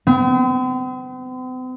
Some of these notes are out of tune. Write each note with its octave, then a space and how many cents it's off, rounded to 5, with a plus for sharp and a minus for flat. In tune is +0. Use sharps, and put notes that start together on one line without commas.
C4 -45